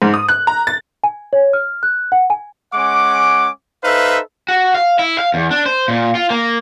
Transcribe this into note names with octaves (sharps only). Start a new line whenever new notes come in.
G#2
D#6
F#6
A#5
A6
G#5
C#5
F6
F#6
F#5
G#5
G#3 C#4 F#5 D6
D#4 A4 B4 C5 E5 F5
F#4
F5
E4
F5
E2
D4
C5
A#2
F4
A#3